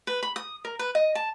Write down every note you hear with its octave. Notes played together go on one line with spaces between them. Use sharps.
B4
B5
D#6
A#4
B4
D#5
A5